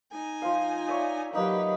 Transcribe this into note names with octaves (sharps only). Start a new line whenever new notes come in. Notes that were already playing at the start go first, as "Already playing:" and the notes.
D#4 G#5
F3 C5 F5
C#5 D5 E5
F#3 A#3 D#4 G4 B4 A#5